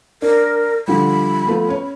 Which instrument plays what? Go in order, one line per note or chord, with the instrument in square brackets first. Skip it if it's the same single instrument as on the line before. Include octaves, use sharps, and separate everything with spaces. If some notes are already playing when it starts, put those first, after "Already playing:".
[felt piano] D4 [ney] A#4
[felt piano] D3 F3 G3 [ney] B5
[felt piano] F3 A3 B3
C#4 C#5